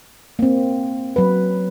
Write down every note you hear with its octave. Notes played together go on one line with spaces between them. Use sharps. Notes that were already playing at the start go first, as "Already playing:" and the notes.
A#3 C4
F#3 B4